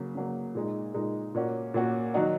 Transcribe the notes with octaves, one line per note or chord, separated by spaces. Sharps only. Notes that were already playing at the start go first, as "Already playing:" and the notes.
Already playing: C#3 F#3 A#3
C#3 F#3 A#3
A#2 G#3 D#4
A#2 G#3 D#4
A#2 A#3 C#4 F#4
A#2 A#3 C#4 F#4
D#3 F#3 D#4 F#4